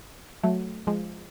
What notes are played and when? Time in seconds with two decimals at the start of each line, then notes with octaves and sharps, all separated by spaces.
0.43 F#3 A3
0.87 F3 G#3